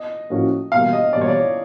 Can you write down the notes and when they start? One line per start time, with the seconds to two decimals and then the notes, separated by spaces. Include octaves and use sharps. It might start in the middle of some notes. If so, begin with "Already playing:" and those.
Already playing: D#5
0.30 A2 F3 A#3 C#4 F#4
0.71 E2 B2 G3 A#3 F5
0.93 D#5
1.13 E2 B2 G3 A#3 D5
1.21 C#5
1.28 D5